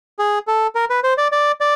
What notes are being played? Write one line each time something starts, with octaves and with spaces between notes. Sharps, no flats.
G#4
A4
A#4
B4
C5
D5
D5
D5